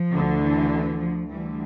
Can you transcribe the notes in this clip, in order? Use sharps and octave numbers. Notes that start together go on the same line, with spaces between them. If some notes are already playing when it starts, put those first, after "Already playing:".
Already playing: F3
D2 D3
E3
F3
D2 D3 E3 G3